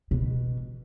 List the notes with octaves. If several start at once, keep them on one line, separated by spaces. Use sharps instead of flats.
B2